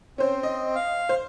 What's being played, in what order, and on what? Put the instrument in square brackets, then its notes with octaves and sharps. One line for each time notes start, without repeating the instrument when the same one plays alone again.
[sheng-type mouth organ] C4 [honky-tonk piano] C#4 C5
[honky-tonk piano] D#5
[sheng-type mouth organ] F5
[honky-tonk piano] C5